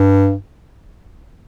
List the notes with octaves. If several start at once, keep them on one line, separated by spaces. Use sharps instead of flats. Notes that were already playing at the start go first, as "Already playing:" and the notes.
Already playing: G2